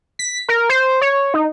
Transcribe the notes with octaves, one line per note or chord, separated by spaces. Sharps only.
B6
A#4
C5
C#5
D#4